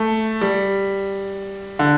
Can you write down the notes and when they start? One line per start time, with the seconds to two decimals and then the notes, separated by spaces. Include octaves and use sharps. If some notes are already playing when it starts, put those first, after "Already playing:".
Already playing: A3
0.41 G3
1.79 D3